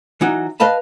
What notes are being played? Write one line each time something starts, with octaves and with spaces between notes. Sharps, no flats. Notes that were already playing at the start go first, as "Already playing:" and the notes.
E3 F#3 D#4 F#4
B4 D#5 F5 A5 B5